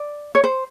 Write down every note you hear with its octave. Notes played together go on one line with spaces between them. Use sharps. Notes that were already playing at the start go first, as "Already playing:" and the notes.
Already playing: D5
C#5
C5